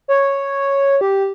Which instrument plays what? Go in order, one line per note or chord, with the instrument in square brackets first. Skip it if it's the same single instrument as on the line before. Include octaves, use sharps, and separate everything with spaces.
[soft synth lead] C#5
G4